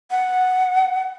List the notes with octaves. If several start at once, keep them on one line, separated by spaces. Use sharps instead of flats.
F#5